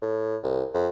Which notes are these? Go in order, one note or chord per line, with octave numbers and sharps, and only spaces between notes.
A2
C2
F2